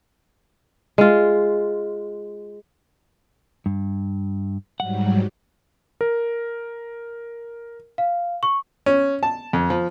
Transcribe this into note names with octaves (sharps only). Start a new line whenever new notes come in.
G#3 F4
G2
G#2 F#3 G3 F#5
A#4
F5
C#6
C#4
A5
F2
F3